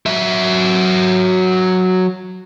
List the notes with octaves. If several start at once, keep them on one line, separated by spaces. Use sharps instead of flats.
F#3 E5